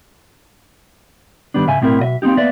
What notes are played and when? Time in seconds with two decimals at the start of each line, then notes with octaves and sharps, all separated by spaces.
1.54 G2 D#3 G3 B3 D4
1.66 G#2 C#3 E5 G#5
1.81 B1 A2 C4 E4 A#4
1.99 B1 B2 D#5 E5
2.22 A#3 C4 C#4 D#4 G4
2.37 A#3 B3 D5 E5